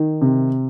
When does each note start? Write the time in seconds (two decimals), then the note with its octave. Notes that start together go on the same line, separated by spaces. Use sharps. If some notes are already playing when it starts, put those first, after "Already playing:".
Already playing: D#3
0.22 C3